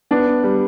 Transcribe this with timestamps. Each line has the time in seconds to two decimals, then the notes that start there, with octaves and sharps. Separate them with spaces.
0.11 B3 D4
0.44 G3